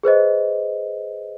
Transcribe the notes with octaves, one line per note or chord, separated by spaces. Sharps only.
G#4 B4 C5 D#5